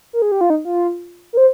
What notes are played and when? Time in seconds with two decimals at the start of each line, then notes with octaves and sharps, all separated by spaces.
0.13 A#4
0.22 G#4
0.32 G4
0.41 F4
0.50 D#4
0.65 F4
1.33 A#4
1.37 C5